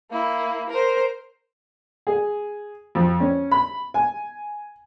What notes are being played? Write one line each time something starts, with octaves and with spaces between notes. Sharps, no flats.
A#3 E4
A#4 C5
G#4
F2
C#4
B5
G#5